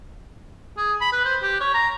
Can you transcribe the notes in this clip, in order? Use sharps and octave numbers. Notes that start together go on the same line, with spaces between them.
G#4
B5
B4
C5
G4
C#5
A#5